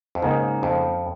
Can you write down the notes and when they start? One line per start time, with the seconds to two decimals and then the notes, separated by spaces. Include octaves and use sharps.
0.15 F2
0.22 G#2 C#3 A#3 D#4
0.63 F2